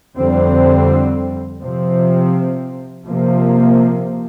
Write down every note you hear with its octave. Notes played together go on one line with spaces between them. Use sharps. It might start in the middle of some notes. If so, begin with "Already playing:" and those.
F2 D3 G3 C4
C3 F3 C4
C3 F3 A#3